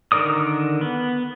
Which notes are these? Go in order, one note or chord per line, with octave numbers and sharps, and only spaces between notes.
D3 D#3 A#4 D5 D#6
B3